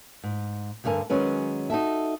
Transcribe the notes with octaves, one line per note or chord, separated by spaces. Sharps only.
G#2
D2 G2 D3 A#4 G#5
D#3 F#3 G#3 C#4 B4
D#4 F#4 A4 E5